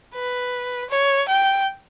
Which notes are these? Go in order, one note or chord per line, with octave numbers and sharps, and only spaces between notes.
B4
C#5
G5